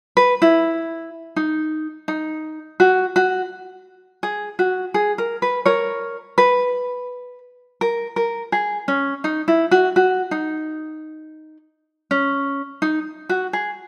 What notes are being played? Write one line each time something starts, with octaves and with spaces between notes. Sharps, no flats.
B4
E4
D#4
D#4
F#4
F#4
G#4
F#4
G#4
A#4
B4
A#4 C#5
B4
A#4
A#4
G#4
C#4
D#4
E4
F#4
F#4
D#4
C#4
D#4
F#4
G#4